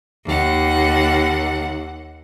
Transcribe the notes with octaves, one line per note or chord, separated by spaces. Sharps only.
D#2 F#5